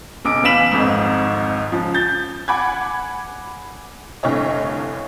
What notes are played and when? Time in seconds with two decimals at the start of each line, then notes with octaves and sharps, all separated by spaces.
0.25 B1 C#3 D6 D7
0.43 E2 F5 B5 B6 E7 F#7
0.72 G#1 F2 G#2
1.72 C#3 F3
1.94 G6 A6
2.48 F#5 G#5 B5 D6 F#6 G#6
4.23 F1 C2 D3 C#5 D#5